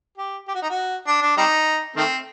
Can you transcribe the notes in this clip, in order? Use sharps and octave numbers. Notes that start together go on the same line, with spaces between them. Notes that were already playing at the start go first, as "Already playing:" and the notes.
G4
G4
F#4
D#4
F#4
D4
D4
G3 C4 D#4
D#3 A3 C4